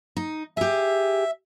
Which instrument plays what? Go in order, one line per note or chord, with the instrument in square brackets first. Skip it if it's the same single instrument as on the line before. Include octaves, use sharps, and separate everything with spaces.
[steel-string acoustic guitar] D#4
[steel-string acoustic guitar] G4 G#4 [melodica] E5